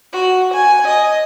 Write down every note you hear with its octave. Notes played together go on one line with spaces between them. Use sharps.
F#4
G#5
D#5